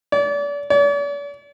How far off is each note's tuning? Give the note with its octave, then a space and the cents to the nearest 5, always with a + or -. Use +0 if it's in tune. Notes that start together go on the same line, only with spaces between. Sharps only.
D5 -35
D5 -45